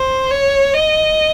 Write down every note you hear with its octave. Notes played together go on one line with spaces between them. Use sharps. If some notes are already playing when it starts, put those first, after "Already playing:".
Already playing: C5
C#5
D#5